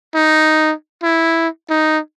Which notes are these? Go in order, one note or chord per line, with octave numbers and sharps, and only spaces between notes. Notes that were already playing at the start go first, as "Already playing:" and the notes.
D#4
E4
D#4